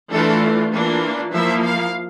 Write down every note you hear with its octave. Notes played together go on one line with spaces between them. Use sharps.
E3 A3 D4 F4 A4
E3 A#3 D4 F4
F3 A#3 E4 E5
F5